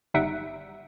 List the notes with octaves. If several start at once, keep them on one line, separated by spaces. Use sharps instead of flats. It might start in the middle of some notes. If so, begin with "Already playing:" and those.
G1 G3 D#4 E5 F#5 D7